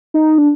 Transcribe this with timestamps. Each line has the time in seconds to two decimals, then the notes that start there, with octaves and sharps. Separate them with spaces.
0.14 D#4
0.38 D4